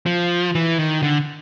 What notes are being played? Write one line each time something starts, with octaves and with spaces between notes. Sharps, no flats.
F3
E3
D#3
D3